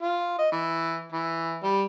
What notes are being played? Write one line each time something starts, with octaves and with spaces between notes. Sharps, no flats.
F4
D#5
E3
E3
G3